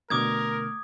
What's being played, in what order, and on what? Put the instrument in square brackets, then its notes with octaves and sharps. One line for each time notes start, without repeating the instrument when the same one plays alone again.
[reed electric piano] B2 D3 A3 [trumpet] A#4 [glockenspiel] D6 D#6 G#6